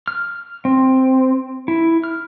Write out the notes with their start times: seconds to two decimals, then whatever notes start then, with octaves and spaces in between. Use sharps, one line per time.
0.08 F6
0.65 C4
1.68 E4
2.04 F6